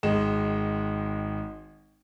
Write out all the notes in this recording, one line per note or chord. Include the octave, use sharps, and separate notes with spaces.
G#1 G#3 D#5 E7